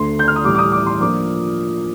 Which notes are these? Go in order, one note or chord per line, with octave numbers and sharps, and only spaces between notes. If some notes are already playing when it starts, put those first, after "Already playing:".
Already playing: D2 D3 A3 C6
G6
F6
D#6
A1 A2 G3 D6
D6
D#6
D6
C6
F3 A#3 D4 F4 D6